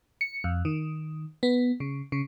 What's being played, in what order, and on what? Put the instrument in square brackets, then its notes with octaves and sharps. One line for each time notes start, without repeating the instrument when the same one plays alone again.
[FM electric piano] C#7
F2
D#3
B3
C#3
C#3